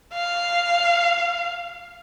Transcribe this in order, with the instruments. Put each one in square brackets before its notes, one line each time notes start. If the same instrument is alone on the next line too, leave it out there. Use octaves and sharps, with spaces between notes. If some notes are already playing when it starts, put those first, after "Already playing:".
[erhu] F5